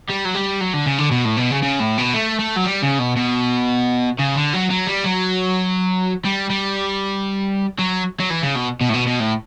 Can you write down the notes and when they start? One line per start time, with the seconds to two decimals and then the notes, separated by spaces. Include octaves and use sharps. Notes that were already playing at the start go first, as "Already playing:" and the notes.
0.09 G3
0.25 F#3
0.34 G3
0.61 F#3
0.73 D3
0.86 C#3
0.98 D3
1.11 B2
1.25 A2
1.37 B2
1.51 C#3
1.62 C#3
1.80 A2
1.98 B2
2.14 A3
2.39 A3
2.57 F#3
2.65 G3
2.83 C#3
2.99 B2
3.17 B2
4.19 C#3
4.36 D3
4.54 F#3
4.71 F#3
4.88 G3
5.05 F#3
6.25 G3
6.50 G3
7.79 F#3
8.20 F#3
8.30 E3
8.42 C#3
8.55 B2
8.81 B2
8.89 A2
8.94 B2
9.07 B2
9.20 A2